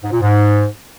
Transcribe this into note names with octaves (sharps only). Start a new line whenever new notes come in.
G#2
A#2
G#2